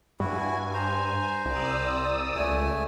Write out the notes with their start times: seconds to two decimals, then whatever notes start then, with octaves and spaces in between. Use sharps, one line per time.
0.20 G2 E4 F#4 G#5
0.74 C5 A#5
1.46 C2 D5 D#6 E6
2.36 C#2 A3 G#5